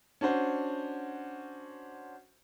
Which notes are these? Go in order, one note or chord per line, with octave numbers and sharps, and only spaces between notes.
C#4 D4 F#4 C5